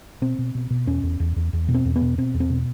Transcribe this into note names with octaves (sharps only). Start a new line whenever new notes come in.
B2 C4
B2
B2
B2
E2 C#4
E2
E2
E2
E2
B2
C4
E2
B3
B2
B2 C4
E2
C4
B2